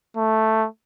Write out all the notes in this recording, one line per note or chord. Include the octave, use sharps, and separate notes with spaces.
A3